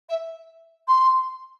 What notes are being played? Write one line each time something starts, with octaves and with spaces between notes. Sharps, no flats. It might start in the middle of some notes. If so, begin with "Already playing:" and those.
E5
C6